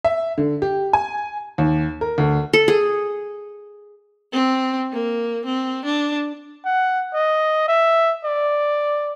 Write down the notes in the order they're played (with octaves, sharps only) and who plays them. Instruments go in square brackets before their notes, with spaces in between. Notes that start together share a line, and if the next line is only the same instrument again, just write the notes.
[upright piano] E5
D3
G4
G#5
D#2
A#4
D2
[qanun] A4
G#4
[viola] C4
A#3
C4
D4
[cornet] F#5
D#5
E5
D5